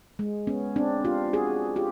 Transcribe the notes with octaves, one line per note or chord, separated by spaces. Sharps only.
G#3
B3 C#4
C4 D4
F4 G4
F#4 G#4
F4 G4